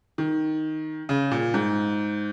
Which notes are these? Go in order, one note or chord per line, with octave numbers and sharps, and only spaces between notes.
D#3
C#3
A#2
G#2